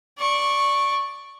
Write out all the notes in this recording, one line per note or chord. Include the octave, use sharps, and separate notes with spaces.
D5 C#6